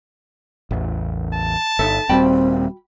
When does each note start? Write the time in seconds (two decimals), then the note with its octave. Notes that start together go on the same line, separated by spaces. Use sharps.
0.71 A1 E2
1.34 A5
1.79 G1 D#4 A4 E5
2.09 D#1 G3 C4 F#4 G5 B5